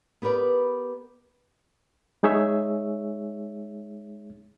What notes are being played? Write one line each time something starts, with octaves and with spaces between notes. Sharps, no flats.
B3 G4 A#4 B4 D5
G#3 D#4 G#4 C#5 E5